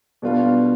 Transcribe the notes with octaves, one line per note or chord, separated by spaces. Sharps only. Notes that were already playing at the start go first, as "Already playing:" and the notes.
B2 G3 B3 D4 F4